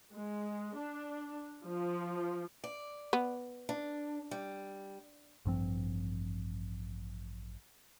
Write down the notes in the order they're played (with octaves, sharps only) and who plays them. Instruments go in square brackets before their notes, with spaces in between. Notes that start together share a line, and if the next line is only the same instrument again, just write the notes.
[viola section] G#3
D4
F3
[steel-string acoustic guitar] D5
[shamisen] B3
[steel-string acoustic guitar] D4
G3
[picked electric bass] A1 G2 F3 C4